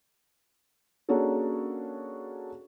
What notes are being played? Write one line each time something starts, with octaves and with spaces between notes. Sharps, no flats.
A#3 C#4 D4 F#4 G#4 A4